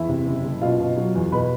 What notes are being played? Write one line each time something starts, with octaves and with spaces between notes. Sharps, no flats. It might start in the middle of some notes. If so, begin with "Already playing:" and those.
Already playing: E2 E4 E5
C3
F#1
F#1
B2 F4 F5
B2
F#3
E2
B2 B4 B5